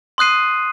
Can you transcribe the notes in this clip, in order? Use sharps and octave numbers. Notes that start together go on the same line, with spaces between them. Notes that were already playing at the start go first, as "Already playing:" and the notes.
C6 D#6 F#6 C7 D#7